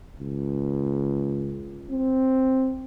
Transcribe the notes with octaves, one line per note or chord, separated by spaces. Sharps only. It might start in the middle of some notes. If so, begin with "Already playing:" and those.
C#2
C4